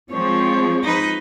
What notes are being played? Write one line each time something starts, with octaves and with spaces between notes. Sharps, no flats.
F3 G#3 C4 C#5
D#4 B4